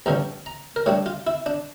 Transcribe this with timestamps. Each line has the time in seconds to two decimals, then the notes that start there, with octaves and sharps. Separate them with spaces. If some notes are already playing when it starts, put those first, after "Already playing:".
0.06 A1 G2 D3 F3 C#4 A#5
0.46 A#5
0.76 A#4
0.86 A2 G3 D4 C#5
1.06 F4
1.27 E4
1.46 D4